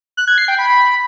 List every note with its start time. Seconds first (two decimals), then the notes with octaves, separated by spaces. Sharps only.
0.17 F#6
0.28 G#6
0.38 C7
0.48 G5
0.58 B5